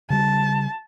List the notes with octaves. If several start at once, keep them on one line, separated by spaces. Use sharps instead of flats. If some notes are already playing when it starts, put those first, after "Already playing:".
C#3 G3 A5